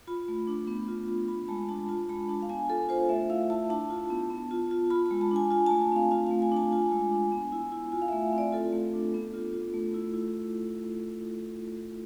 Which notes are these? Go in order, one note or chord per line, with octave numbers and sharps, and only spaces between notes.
F4 B5
A3
D4
B3
F4
F4
F4 B5
G#3 A5
D4 A5
F4 A5
G#3 B5
D4 A5
F5
B3 G#5
F4 A4
F4 C5
A3 E5
E4 F5
E4 A5
D4 A5
F4
B3
B3
F4
F4
F4 B5
B5
G#3
A5
D4 G#5
F4 G#5
A3 A5
G#5
C4 F5
F4 F5
A3 F5
G#5
D4 A5
F4 G#5
G#3
D4
B3
E4
E4
F4 G#5
F5
A3 E5
C4
D5
F4 A4
A3
D4
B3
F4
F4
A3
E4
E4